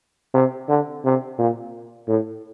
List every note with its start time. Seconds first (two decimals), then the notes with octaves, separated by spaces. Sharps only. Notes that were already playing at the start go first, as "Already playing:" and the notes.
0.34 C3
0.69 D3
1.04 C3
1.38 A#2
2.08 A2